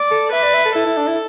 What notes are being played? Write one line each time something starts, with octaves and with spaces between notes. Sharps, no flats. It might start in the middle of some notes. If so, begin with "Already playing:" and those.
Already playing: D5
A4
B4 E5
D5
E5
A4
E4 A4
E4
D4
E4